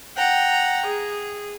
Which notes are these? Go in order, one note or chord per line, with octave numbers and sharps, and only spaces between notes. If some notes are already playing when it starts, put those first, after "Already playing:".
F#5 G5 A#5
G#4